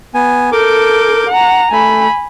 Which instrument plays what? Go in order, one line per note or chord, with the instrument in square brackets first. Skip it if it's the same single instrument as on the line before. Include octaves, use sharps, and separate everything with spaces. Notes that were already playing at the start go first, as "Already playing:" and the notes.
[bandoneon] B3 G#5
[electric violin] A4 G6 [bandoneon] A#4 D6
[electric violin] F#5 A#5
[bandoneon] A3 [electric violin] G#5 B5